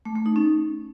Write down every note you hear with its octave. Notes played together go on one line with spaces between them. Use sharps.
A3
A3
D#4
C#4